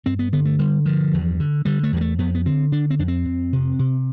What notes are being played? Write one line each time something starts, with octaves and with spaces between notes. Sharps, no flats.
G2 C4
B3
D3 B3
A3
D3 G3
G2 F3
E2
D3
D3 G3
A3
E2 G3
A3
F2 B3
B3
D3 C4
D3 D4
C4
F2 D4
C4
F2
C3
C3